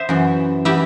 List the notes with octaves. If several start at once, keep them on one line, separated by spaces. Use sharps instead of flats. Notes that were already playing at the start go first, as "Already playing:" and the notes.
Already playing: C5 E5
F#2 E3
E3 E4 G4